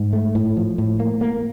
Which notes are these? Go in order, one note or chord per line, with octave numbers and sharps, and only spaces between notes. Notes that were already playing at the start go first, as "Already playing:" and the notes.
Already playing: G#2
A3
A2
F3
A2
A#3
A#3